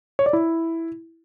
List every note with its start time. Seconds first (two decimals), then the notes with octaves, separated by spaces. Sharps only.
0.19 C#5
0.26 D5
0.33 E4